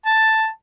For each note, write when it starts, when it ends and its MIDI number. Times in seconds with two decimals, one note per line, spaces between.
0.06 0.47 81